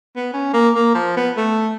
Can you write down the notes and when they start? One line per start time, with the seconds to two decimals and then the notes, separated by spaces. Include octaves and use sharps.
0.16 B3
0.33 C#4
0.53 A#3
0.75 A#3
0.94 F3
1.17 B3
1.37 A3